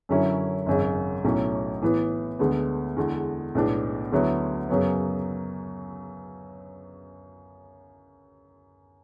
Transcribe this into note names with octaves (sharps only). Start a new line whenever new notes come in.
F#2 D3 F#3 C#4 E4
G#1 F#2 C#3
B1 A2 F#3 A3 C#4
A2 E3 B3
D2 D3 G#3 B3
E2 D3 G#3
B1 A2 G#3 B3 D4
D2 D3 F#3 B3 E4
F#2 C#3 F#3 B3